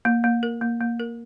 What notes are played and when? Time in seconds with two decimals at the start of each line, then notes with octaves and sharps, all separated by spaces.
0.05 A#3
0.24 A#3
0.43 A#4
0.61 A#3
0.81 A#3
1.00 A#4